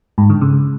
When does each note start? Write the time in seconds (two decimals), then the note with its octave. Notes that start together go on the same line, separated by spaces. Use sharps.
0.18 G#2
0.30 D3
0.41 C#3